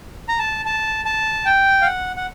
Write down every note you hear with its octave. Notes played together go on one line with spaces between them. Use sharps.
A#5
A5
A5
A5
G5
F5
F#5
F#5